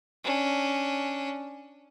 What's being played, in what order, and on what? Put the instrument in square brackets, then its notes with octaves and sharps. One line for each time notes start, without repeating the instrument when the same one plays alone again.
[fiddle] C#4 D4